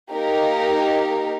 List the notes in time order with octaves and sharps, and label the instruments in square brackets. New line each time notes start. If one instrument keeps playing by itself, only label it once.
[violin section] A#3 D#4 G4 A#4